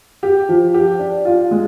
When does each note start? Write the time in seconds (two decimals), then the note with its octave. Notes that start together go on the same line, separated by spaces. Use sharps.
0.23 G4
0.49 F3
0.74 G4
0.99 D4
1.25 F4
1.51 G#3